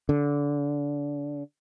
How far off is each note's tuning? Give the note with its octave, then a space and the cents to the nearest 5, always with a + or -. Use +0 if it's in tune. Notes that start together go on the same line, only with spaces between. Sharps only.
D3 -25